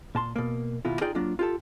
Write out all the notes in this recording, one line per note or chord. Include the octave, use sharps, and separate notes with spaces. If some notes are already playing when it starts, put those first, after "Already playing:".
A#2 A5 C6
B2 A#3
D#2 B2 E4 F4
D#4 F4 G#4 D5 G5
F#3 A#3 D4 F4
F4 G4 A4